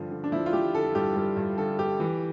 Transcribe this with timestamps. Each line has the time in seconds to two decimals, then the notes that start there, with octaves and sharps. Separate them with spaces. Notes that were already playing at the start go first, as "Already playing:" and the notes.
Already playing: G2 D3 F3
0.11 D3
0.24 D4
0.32 F3 E4
0.46 F4
0.53 F3 G4
0.75 D3 A4
0.95 G2 G4
1.16 G2 A4
1.37 G2
1.58 D3 A4
1.78 G2 G4
2.00 E3